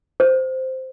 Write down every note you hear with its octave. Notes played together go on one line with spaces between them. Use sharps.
C5